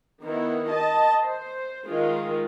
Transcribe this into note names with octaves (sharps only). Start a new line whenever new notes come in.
D#3 B3 E4
D#5 A5
C5
D#3 G#3 F4